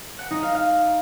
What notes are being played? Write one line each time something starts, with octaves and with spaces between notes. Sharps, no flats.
F#5
D#4
F5
F5